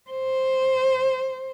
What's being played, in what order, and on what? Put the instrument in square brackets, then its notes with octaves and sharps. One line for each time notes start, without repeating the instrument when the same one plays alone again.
[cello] C5